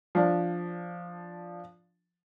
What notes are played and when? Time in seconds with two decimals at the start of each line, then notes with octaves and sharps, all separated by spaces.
0.15 F3 D4